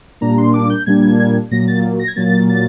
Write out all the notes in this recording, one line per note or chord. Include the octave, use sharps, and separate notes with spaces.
A#2 G3 A#3 D4 A#5
C6
D6
G6
A#2 G3 A#3 D4 G#6
G#6
G#6
A#2 F#3 A#3 A#6
A6
A#6
G#6
A#2 F#3 A#3 A6
A6